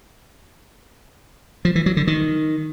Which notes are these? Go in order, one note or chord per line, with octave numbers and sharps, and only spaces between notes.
F3
E3
F#3
D3
D#3